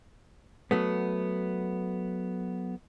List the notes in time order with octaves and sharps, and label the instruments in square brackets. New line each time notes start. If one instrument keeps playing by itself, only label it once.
[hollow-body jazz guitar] F#3 A3 B3